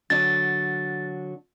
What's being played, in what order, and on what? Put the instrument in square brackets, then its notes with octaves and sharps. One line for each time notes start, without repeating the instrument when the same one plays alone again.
[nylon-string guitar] D3 F#3 D4 [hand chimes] A6